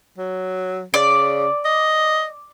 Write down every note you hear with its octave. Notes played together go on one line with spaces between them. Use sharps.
F#3
C#3 D5
D#5